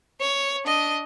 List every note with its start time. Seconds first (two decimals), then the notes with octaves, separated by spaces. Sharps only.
0.21 C#5
0.65 D4 D#5